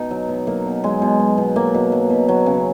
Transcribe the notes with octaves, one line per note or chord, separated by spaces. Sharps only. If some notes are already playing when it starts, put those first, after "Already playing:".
Already playing: B2 D#4
F#3
B2
F#3 A#3
B2
F#3 G#3
B2
F#3
B2
F#3 A#3
B2
F#3
B2
F#3
C#3